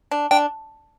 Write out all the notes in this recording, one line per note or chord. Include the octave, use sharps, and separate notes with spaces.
D4
D4 G5